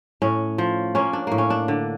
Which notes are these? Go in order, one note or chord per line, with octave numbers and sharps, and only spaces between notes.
A2 C#4
F3
A#3 C#4
D4
A2 A#3
C#4
D4
D3